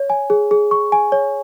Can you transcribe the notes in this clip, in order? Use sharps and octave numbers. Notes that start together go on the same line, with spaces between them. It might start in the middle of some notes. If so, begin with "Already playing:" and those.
Already playing: C#5
G#5
G#4
G#4
C#6
G#5
C#5